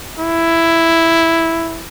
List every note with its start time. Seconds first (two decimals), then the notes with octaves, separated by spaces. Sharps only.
0.18 E4